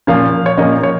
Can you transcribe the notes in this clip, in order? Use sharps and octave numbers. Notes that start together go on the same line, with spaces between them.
A#2 F3 A#3 C#4 F5
C#5
A#2 F3 A#3 C#4 D#5
C#5